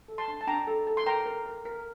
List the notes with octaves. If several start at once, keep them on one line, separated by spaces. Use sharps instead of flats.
A4
A5 C6
D4
A5
D4 G5 A#5
A4
A4
C6
A#4 G5 A#5
A#4
A#4
A#4